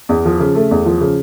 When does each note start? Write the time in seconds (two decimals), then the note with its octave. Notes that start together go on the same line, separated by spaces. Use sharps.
0.09 E2
0.25 F3
0.40 C#3
0.55 A3
0.71 E2
0.86 F3
1.01 C#3